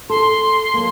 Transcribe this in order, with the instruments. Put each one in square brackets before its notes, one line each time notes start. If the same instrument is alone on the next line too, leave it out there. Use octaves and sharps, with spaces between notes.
[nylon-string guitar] A4 [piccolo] C6
[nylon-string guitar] F#3 A#3